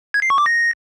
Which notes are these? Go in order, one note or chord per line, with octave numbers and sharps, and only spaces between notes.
G#6
C7
C#6
D6
A#6